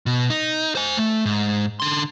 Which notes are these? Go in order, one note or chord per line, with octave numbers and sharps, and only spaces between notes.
B2
D#4
C5 G#5
A3
G#2
D3 C6